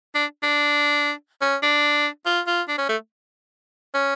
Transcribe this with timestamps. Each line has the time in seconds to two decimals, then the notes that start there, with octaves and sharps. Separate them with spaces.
0.15 D4
0.43 D4
1.41 C#4
1.62 D4
2.26 F4
2.47 F4
2.68 D4
2.78 C#4
2.89 A3
3.94 C#4